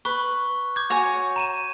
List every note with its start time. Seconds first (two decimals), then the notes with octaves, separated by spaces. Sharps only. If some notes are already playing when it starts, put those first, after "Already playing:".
0.05 B4 C#6
0.76 D6 G6 G#6
0.90 F#4 C#5 G#5
1.36 A#5 D#7 E7